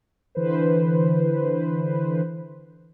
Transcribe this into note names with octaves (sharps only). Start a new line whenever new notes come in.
D3 E3 B4 C5